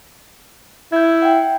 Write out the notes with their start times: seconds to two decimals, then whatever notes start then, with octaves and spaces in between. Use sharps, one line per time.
0.92 E4 G6 G#6
1.22 F#5 G5